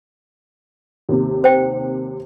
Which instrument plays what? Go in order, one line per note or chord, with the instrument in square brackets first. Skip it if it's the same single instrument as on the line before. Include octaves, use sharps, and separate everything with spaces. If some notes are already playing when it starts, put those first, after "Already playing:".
[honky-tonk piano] D#2 C3
[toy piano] C5 G5